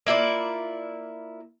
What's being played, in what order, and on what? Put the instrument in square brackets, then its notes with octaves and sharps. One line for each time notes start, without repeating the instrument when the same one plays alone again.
[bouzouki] A#3 E4 F4 D5